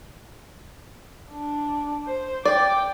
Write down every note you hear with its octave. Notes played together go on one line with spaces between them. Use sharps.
D4
C5
D5 G5 D6